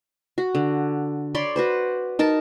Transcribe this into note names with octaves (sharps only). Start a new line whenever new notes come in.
F#4
D3
C#5 D5 B5 C6
F#4 B4 C5
D#4 A#4 A5